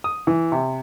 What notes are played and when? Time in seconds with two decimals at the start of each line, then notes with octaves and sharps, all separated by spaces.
0.04 D#6
0.27 E3
0.52 C3